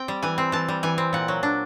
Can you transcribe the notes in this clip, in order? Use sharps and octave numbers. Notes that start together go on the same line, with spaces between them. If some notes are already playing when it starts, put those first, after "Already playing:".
Already playing: C4 G5
G3
E3 G#5
C4
E3 A5
G3
E3 G#5
C4
A#2 F#5
F#3
D4